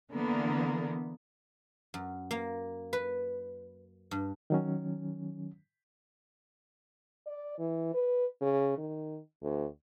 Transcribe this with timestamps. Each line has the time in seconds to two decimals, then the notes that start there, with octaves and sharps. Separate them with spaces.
0.11 D3 E3 A#3 B3
1.94 F#2
2.31 A#3
2.93 B4
4.11 G2
4.50 D#3 F#3 C#4
7.27 D5
7.59 E3
7.94 B4
8.41 C#3
8.78 D#3
9.42 D2